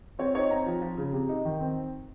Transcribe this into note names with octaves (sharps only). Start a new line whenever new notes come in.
C4 C#5
D#4 C#5
C4 A#5
F3
F3
C#3
C3
D#4
D#3
C4